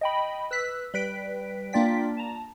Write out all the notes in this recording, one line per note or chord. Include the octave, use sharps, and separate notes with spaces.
D#5 G5 B5
B4 E6 F#6 B6
G3 B4 B6 D7
A#3 D4 F4 D5 G5 B6
A5 A#5